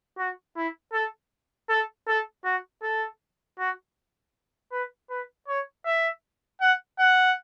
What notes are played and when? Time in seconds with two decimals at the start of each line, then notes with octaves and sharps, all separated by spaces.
0.18 F#4
0.56 E4
0.93 A4
1.69 A4
2.07 A4
2.44 F#4
2.82 A4
3.59 F#4
4.72 B4
5.10 B4
5.48 C#5
5.85 E5
6.61 F#5
6.99 F#5